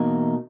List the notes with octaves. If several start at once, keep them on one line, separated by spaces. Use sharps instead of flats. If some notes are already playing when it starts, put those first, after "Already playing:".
Already playing: E2 B2 A#3 D#4